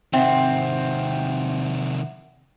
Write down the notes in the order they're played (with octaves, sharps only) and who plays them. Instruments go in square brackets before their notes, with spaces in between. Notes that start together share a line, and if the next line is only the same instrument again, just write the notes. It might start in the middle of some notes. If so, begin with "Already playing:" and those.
[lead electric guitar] C3 D#3 [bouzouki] C4 [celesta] E5 F#5